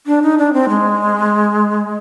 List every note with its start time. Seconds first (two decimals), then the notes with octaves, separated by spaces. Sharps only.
0.07 D4
0.23 D#4
0.38 D4
0.53 C4
0.69 G#3